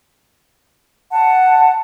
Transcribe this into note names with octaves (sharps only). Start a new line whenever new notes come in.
F#5 A5